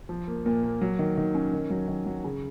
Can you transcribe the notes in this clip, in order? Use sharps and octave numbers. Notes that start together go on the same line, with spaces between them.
F3
A#3
A#2
A#3
F#3
D#3
D#3
C#4
D#3
F#3
D#3
F#3
C#3